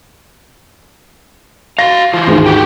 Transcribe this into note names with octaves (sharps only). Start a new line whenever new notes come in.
F#4 F5 A#6
E3 F4
D2 G#2 D#3
F#4 G4 G5